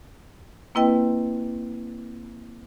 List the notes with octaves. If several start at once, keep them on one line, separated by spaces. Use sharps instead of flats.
A#3 C4 E4 B4 D#5 G5